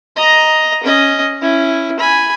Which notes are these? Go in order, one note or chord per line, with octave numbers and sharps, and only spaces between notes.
D#5 A#5
C#4 D#5
C#4 E4
G#5 B5